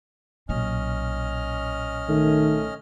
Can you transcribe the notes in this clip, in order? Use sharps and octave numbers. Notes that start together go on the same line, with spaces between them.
B1 A#2 C#4 D#5 F6
D#3 A3